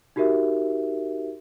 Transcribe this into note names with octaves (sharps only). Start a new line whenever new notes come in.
D#4 F#4 G4 A#4 E5